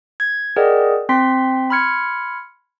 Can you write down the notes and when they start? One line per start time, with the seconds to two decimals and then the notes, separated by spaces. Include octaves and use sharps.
0.20 G#6
0.56 G#4 A#4 D5 D#5 F#5 G5
1.09 C4 G5 C6 B6
1.70 B5 C6 F6 G#6 C#7